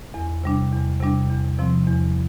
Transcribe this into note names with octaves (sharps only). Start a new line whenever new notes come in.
E2
C3 G3 D4
E2
C3 G3 D4
E2
C3 F3 C4
E2